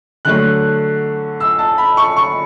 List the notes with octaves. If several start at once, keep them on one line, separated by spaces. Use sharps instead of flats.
D3 F#3 A3 F#6
E6
A5
B5
C#6
C#6